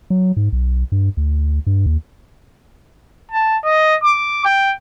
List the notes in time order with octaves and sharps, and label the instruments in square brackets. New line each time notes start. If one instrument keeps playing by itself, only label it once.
[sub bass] F#3
G#2
B1
G2
D2
G2
D#2
[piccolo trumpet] A5
D#5
D6
G5